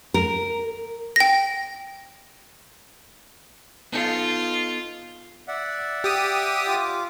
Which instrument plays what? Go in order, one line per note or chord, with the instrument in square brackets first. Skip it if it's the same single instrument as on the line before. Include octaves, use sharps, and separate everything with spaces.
[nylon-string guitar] A#4
[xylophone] G5 A#6
[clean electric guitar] B3 D#4 A4 [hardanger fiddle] F4
[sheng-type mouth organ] D5 E5 F#5
[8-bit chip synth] G4 D#6
[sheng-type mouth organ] F4 D6